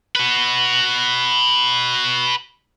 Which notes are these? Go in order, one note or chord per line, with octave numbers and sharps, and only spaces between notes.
F#4 B4